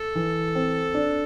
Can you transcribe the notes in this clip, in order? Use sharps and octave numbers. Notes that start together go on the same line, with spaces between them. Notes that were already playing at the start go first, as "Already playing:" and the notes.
Already playing: A4
E3
C4
D4